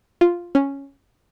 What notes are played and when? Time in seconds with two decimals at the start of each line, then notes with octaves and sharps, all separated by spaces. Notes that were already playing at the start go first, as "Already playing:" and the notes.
0.21 F4
0.55 C#4